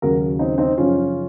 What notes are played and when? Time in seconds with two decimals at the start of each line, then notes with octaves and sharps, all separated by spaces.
0.02 D#2 C#3 F#3 F#4 A#4
0.39 C4 D#4
0.58 C4 D#4
0.77 F#2 C#3 F3 C#4 F4